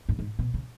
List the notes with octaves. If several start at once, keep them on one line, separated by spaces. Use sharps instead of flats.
G#2
G#2
B2
C#3